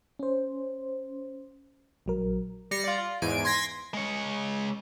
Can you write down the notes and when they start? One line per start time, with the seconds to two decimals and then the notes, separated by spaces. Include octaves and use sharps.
0.19 C#4 C5
2.06 A#1 F#3 A#4
2.71 G3 A#6 C7 C#7
2.84 F4 D5
2.98 F4
3.22 E2 G#2 G#5 D7
3.45 C6 G#6 A#6 B6
3.94 G#3 C#5